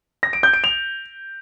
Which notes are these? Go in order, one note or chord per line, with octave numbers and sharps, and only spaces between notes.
A#6
D7
G6
D7
F7